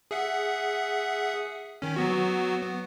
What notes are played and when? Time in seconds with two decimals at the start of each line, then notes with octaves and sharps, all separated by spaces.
0.11 G#4 E5 F#5
1.82 D#3 C#4
1.96 F#3 B3 F#4
2.63 B3